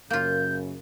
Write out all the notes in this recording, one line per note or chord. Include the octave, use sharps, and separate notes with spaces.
F#2 C#3 A#3 F4 G6